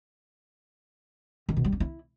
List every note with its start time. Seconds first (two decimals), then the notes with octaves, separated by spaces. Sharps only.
1.49 D#3
1.57 B2
1.64 G3
1.72 D4
1.80 E4